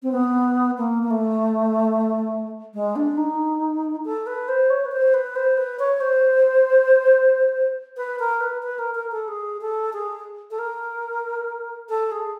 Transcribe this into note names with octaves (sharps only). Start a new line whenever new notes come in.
C4
B3
A#3
A#3
A3
G#3
D4
D#4
A4
B4
C5
C#5
B4
C5
B4
C5
B4
C#5
C5
B4
A#4
B4
B4
A#4
A#4
A4
G#4
A4
G#4
A4
A#4
A4
G#4